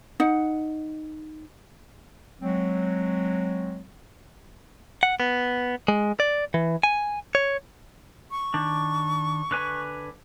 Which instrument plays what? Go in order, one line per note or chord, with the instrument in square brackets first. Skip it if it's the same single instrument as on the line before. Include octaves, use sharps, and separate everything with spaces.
[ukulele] D#4 F#5
[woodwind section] F#3 G#3 C4
[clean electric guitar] F#5
B3
G#3
D5
E3
G#5
C#5
[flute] C#6
[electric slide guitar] D#3 D4
D3 B4 G#5